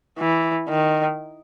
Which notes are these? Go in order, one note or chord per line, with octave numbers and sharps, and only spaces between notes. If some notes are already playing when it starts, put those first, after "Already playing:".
E3
D#3